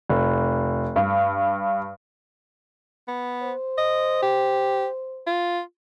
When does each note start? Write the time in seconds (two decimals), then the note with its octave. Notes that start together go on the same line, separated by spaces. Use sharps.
0.10 F1
0.96 G2
3.08 B3
3.43 C5
3.78 D#5
4.23 G4
5.27 F4